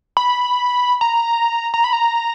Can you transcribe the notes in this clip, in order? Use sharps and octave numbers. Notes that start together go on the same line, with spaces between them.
B5
A#5
A#5
B5
A#5